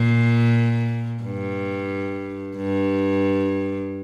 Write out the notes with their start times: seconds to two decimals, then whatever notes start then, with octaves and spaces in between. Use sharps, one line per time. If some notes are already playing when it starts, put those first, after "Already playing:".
Already playing: A#2
1.23 G2
2.56 G2